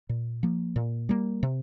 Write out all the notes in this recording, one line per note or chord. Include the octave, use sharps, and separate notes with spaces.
A#2
F3 A#3
A#2
G3 A#3
C3